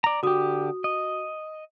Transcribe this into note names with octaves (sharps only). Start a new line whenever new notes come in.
D5 A#5
D3 F#4 G4 D#6
D#5